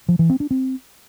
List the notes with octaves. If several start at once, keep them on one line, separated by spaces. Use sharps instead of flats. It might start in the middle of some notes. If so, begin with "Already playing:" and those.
F3
E3
C4
D4
C4